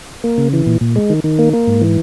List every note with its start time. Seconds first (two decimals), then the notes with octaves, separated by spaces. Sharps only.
0.24 A#3
0.38 C#3
0.53 E3
0.67 A#2
0.81 A#2
0.96 G#3
1.10 D#3
1.24 D#3
1.39 A#3
1.53 A#3
1.67 G#2
1.81 E3